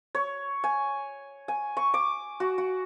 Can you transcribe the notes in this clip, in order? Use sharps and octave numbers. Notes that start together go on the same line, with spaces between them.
C#5
G#5
G#5
C#6
D6
F#4
F#4